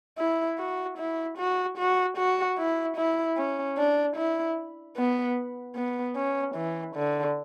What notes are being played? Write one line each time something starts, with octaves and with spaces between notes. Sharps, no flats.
E4
F#4
E4
F#4
F#4
F#4
E4
E4
C#4
D4
E4
B3
B3
C#4
E3
D3